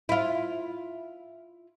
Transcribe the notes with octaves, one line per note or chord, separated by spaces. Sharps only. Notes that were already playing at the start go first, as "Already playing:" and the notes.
E4 F4